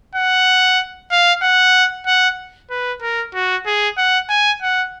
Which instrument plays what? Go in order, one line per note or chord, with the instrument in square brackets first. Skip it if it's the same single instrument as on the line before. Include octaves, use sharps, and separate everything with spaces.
[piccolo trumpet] F#5
F5
F#5
F#5
B4
A#4
F#4
G#4
F#5
G#5
F#5